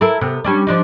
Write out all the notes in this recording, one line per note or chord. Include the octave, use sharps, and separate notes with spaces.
E4 A4 A#4
C3 B3
G3 C#4 D4
F3 D4 D#4